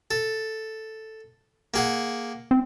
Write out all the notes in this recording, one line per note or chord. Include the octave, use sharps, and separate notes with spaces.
A4
A#3 G#4 F#5
C4